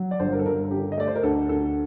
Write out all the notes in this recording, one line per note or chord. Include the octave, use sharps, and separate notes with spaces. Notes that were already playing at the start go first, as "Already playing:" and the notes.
Already playing: F#3
D5
G1 C5
A#4
A4
G1 A#4
D3 G4
D#5
A3 D5
C5
A#4
D2 A4
D2 A4